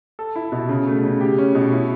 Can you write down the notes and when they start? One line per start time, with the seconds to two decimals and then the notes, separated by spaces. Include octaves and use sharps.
0.19 A4
0.36 E4
0.52 B2
0.69 C#3
0.87 A3
1.04 C#3
1.21 G4
1.38 C#4
1.55 B2
1.72 E4